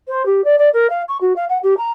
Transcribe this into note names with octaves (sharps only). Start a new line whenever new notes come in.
C5
G4
D5
D5
A#4
F5
C#6
F#4
F5
F#5
G4
A#5